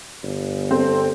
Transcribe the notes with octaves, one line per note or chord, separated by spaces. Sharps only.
G1
C4 A4